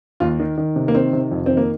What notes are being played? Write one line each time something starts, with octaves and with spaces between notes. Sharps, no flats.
D#2 F4
D#3
D#3
C3
A#3
D#3 C4
C3
F2
D#3 C4
A#3